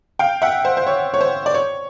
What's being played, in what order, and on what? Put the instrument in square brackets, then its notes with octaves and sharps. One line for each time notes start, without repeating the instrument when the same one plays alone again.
[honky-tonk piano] F5 G5
E5 F#5
C5
C5
C#5
C#5
C5
D5
C#5